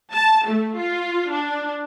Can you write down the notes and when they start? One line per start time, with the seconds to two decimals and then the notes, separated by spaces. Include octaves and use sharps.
0.13 A5
0.47 A3
0.78 F4
1.31 D4